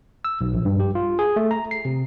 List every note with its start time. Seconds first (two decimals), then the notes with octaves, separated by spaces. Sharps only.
0.25 E6
0.41 B1
0.54 A#1
0.65 G2
0.80 G4
0.95 F4
1.19 G#4
1.36 A3
1.51 A#5
1.71 C7
1.85 C3